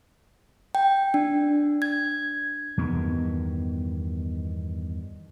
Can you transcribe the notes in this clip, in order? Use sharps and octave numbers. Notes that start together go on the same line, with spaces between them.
G5
D4
G#6
E2 G2 D#3 B3